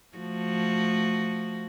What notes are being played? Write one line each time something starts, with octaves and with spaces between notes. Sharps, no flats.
F3 A3 F#4